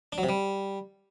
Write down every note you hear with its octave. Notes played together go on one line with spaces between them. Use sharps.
D4
F#3
C3
G3